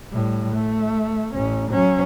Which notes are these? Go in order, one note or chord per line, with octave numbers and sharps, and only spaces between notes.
A2 G3
A3
A1 C#4
F#3 C#4